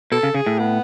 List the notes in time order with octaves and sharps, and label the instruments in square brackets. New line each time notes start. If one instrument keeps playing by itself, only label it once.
[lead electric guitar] B2 [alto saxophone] A4
[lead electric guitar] C#3
[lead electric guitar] C#3 [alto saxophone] G#4
[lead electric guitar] A2
[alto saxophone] B3